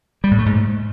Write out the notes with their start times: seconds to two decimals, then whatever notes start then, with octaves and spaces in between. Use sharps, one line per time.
0.24 G3
0.31 A2
0.39 A3
0.46 G#2